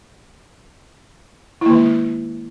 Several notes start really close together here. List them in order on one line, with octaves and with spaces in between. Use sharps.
E4 A#3 D#3 G#3